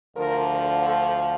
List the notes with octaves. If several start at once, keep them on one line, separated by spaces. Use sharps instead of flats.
D2 D3 F3 A#4
A4